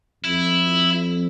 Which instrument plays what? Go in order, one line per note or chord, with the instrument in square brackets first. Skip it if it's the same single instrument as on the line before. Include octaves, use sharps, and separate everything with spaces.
[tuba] F2 [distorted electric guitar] E4